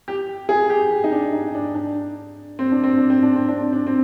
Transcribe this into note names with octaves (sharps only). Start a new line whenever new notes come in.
G4
G#4
G4
G4
D#4
D4
D#4
D4
D4
C4
D4
C4
D4
C4
D4
C4
D4
C4
D4
C4